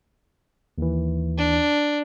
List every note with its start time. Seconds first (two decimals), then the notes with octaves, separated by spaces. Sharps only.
0.78 D#2 E3
1.38 D4